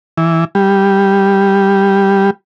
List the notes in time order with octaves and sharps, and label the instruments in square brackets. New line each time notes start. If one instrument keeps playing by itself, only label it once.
[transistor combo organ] E3
G3